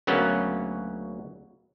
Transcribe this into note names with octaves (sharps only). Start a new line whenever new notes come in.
D2 C#3 F#3 A#3 B3 C#4